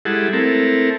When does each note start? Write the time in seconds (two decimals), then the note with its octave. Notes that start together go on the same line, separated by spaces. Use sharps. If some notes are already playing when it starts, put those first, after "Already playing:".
0.05 G3 G#3 E4 G#4 A4 F#5
0.33 A3 C4 E4 A4 A#4